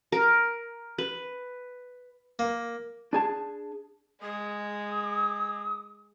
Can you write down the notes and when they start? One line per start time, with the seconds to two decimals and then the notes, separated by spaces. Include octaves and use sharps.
0.12 A#4
0.98 B4
2.39 A#3
3.13 D4 G#4 A5
4.22 G#3 D#6